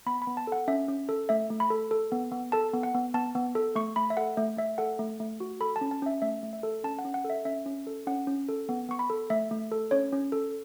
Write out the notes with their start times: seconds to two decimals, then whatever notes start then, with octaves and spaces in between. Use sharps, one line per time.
0.06 B3 B5
0.22 B5
0.27 B3
0.37 A5
0.47 A4 F#5
0.68 C#4 E5
0.88 C#4
1.09 A4
1.29 A3 E5
1.50 A3
1.60 B5
1.70 A4
1.91 A4
2.12 B3
2.32 B3
2.52 A4 A5
2.73 B3
2.83 F#5
2.94 B3
3.14 B3 A5
3.35 B3
3.55 A4
3.75 A3 C#6
3.96 A3 B5
4.10 E5
4.17 A4 F#5
4.37 A3 E5
4.57 A3 E5
4.78 A4 F#5
4.99 A3
5.20 A3
5.40 F#4
5.61 A4 B5
5.76 A5
5.81 C#4
5.91 A5
6.02 C#4 E5
6.22 A3 E5
6.43 A3
6.53 E5
6.63 A4
6.84 C#4 A5
6.99 F#5
7.05 C#4
7.14 F#5
7.25 A4
7.30 E5
7.45 C#4 E5
7.66 C#4
7.87 A4
8.07 C#4 F#5
8.27 C#4
8.49 A4
8.69 B3
8.89 B3 C#6
8.99 B5
9.10 A4
9.30 A3 E5
9.51 A3
9.72 A4
9.91 C#4 C#5
10.12 C#4
10.32 A4